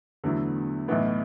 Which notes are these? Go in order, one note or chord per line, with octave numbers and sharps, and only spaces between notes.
E2 D3 F#3 A3 E4
B1 A2 E3 B3